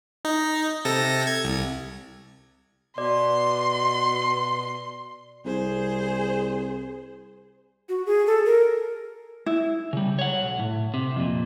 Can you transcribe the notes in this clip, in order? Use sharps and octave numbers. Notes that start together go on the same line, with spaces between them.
D#4
C3 A4 A#6
G#6
C2
B2 D5 C6
C2 G#4 C5
F#4
G#4
A4
A#4
E4
C#3 G3
C#5 F#5
B1
A2
C3
F2 A#2